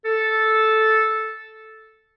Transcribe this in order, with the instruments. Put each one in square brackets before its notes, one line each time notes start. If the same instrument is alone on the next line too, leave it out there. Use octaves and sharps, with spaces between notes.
[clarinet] A4